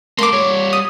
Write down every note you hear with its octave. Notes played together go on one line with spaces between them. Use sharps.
A3 A#3 C6 D6
G3 C#5
D#6